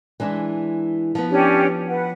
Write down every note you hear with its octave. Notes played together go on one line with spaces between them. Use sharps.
E3 G#3 D4
F3 B3
C#4 D4 G4
B4 F#5